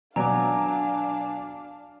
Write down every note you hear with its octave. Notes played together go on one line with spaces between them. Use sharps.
B2 F#3 D4 D5 F5 G#5 A#5 D6